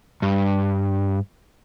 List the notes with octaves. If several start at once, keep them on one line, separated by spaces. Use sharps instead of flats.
G2